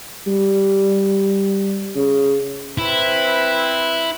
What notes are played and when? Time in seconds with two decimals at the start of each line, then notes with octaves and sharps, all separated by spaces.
0.27 G3
1.96 C#3
2.78 C4 E4 B4